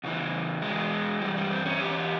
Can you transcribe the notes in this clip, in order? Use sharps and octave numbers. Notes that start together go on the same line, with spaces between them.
E2 C#3 E3
E2 E3 G#3
G2 E3 G3
G3
C4
C#4
E2 E3 G4